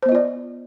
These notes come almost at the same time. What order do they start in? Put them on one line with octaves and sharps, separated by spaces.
C5 B3 D#5 F4 D5